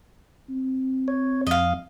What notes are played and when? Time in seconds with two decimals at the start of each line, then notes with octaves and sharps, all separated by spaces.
0.49 C4
1.08 C#5
1.47 F2 D#5 F5